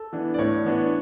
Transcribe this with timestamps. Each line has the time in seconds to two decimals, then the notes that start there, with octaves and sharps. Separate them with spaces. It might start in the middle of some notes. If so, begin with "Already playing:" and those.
Already playing: A4
0.13 E3 B3 D4
0.34 D5
0.38 A2 C#5
0.64 E3 B3 D4